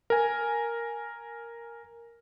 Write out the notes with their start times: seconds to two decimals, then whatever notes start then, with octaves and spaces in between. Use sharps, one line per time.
0.10 A#4 G#5